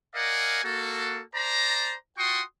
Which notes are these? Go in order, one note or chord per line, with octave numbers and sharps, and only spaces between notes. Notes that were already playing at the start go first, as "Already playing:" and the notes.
A#4 D5 D#5 F5 F#5 G#5
A#3 F#4 A4
C5 D5 A5 A#5
F4 F#4 G5 C6 C#6 D#6